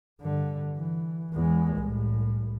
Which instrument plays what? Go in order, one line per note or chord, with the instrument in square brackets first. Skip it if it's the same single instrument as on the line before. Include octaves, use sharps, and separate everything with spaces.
[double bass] G2 D3
E3
E2 G#3
C2 A2